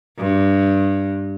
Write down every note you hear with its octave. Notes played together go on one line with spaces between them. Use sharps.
G2